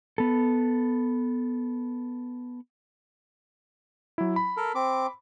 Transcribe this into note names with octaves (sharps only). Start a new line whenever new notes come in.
B3 A4
F#3 E4
B5
A4 A#4
C4 D6